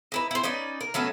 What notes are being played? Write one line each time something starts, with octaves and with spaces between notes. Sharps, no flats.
D#4 E4 B4
E4 C5
C#4 D#4 B4 D5
A#4
F#3 A3 B3 C#4